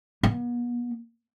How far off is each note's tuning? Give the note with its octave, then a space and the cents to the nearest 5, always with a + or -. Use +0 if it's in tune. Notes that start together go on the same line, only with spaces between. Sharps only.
B3 -40